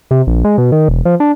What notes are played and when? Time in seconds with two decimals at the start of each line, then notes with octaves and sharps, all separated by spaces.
0.11 C3
0.27 A#1
0.44 G#3
0.58 B2
0.72 D#3
0.89 E1
1.05 F3
1.20 D4